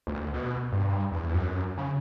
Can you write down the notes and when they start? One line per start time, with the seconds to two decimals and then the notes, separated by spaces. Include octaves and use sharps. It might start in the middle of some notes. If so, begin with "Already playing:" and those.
0.07 D2
0.34 B2
0.72 G2
1.12 E2
1.34 F#2
1.78 C#3